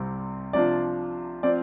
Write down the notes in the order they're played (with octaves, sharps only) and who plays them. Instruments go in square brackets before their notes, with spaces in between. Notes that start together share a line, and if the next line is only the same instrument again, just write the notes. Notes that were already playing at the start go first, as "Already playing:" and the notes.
Already playing: [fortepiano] C2 C3 G3 C4
[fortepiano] C3 F3 D4 F4 [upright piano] D5
[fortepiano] F3 C4 [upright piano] D5